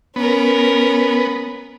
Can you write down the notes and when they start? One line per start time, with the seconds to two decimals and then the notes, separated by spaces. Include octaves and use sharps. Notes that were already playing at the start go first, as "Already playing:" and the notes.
0.16 B3 C#4 A#4